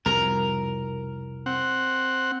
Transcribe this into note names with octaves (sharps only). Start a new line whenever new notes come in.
C2 F2 B2 A#4
C4 F#5